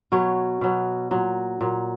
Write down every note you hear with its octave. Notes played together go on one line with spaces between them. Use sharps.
B2 F#3 C#5
B2 F#3
A#2 F#3
A#2 F#3